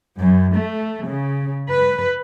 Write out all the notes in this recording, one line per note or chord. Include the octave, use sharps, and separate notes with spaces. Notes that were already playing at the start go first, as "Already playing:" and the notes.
F#2
A3
C#3
B4